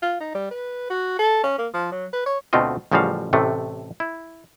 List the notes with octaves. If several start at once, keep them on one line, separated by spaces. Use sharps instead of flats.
F4
D#4
G3
B4
F#4
A4
C#4
A#3
F3
F#3
B4
C#5
D2 B2 A3 C4 F4 D#5
A1 C#3 F3 G3 F#4 F5
A1 A2 C3 A3
E4